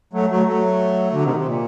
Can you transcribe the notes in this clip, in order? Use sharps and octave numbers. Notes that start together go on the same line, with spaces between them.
F#3 A3
F#3 A3
F#3 A3
D3 F#3
C3 D#3
C3
A#2